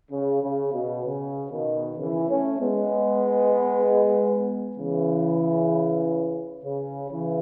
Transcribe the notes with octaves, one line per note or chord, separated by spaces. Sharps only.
C#3
C#3
B2
C#3
B2 D#3
C#3 E3
A3 C#4
G#3 B3
C#3 E3
C#3
C#3 E3